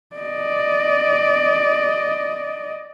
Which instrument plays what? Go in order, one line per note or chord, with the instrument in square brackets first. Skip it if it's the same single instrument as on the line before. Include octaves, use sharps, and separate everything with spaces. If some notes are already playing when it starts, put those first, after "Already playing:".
[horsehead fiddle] D5 D#5